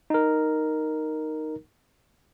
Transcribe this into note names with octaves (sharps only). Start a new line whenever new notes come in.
D#4 A#4